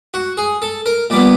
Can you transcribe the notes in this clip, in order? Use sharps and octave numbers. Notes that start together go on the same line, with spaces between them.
F#4
G#4
A4
A#4
A#2 G3 B3 D5